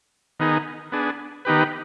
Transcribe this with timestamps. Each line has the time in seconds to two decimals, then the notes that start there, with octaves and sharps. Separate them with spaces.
0.40 D#3 B3 D#4 G#4
0.92 B3 D4 G#4
1.45 D#3 B3 D#4 G4 B4